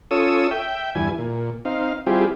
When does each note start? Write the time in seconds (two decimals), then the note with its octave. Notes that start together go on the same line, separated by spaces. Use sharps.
0.11 C#4 F4 A4 C#5 D#6 E6
0.51 E5 G5
0.95 E2 G2 E4 G#5
1.18 A#2
1.65 C4 D#4 F5
2.07 G3 C4 E4 F4 G4 G#4